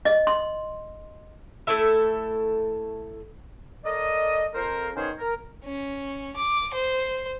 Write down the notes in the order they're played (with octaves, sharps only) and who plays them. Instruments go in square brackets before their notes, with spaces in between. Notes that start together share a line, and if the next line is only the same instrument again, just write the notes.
[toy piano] D#5
C6
[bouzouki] A3 E4 A4 E5
[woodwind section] A4 A#4 D5 D#5
F2 A#4 C5
D#3 B3 C#4 G#4 C5 C#5
A#4
[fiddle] C#4
D6
C5